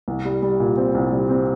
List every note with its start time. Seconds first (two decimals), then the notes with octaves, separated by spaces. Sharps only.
0.08 C2
0.25 G3
0.42 G3
0.60 A#2
0.77 C4
0.95 C2
1.12 G3
1.30 C4